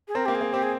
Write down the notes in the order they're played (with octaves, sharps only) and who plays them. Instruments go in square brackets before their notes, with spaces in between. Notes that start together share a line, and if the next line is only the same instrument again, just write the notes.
[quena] G#4
[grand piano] C4 [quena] A#4
[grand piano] A#3 [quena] G4
[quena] G#4
[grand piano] A#3
[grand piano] C4 [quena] G4
[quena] G#4